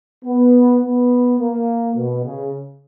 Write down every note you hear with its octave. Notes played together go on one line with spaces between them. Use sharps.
B3
B3
A#3
B2
C#3